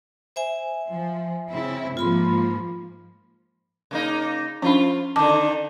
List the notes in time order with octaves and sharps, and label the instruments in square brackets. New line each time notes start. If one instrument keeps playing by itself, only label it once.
[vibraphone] C5 E5 G#5
[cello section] F3
C#3 C4 E4
[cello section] G#2 F3 A#3 [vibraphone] F4 B5 C6
[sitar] C#3 A#3 D#4
[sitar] F3 F4 [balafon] C#4 D4
[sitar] D3 D#3 [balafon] A5 D6